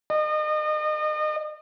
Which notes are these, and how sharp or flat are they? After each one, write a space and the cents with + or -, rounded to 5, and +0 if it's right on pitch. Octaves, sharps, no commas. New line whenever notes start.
D#5 -35